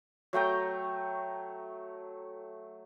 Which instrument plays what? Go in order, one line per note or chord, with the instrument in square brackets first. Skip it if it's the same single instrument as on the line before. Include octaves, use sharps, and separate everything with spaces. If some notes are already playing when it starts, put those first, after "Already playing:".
[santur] F#3 A3 G5 A#5